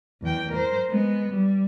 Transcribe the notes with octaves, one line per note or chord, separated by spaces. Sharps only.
E2 G5
A#4 C5
G#3 B3
G3